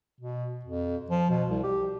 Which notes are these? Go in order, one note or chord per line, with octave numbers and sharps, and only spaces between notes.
B2
F2
F3
B2
C2
G4